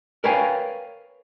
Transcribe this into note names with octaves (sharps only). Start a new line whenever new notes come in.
A#4 B4 C#5 F5 G5 G#5